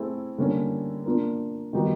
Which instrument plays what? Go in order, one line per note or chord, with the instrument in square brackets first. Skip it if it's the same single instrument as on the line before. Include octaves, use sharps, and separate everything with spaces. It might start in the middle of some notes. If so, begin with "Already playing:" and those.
Already playing: [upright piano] A3 C4 E4 G#4
D3 G3 A#3 C#4 E4
A#3 D4 F4 A#4
D#3 G3 B3 D#4 F#4